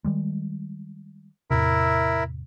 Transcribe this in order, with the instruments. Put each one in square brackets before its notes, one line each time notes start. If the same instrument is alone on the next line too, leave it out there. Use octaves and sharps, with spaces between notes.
[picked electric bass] D#3 G3 G#3
[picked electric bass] E2 A2 C3 [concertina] E4 A#4 E5